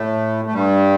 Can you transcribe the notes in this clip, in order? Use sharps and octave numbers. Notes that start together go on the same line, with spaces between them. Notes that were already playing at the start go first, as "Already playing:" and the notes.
Already playing: A2 A3
A3
G2 G3